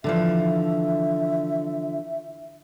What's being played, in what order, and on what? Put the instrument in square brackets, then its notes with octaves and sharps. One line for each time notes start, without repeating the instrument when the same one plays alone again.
[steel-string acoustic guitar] D3 E3 F3 [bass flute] E5